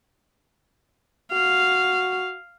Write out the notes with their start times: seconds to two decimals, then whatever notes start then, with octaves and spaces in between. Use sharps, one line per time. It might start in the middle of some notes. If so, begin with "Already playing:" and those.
1.33 F#4 F5